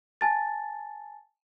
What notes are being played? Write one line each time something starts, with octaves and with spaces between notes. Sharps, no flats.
G#5 A5 A6